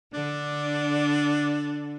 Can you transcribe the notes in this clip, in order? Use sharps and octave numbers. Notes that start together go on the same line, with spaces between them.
D3 D4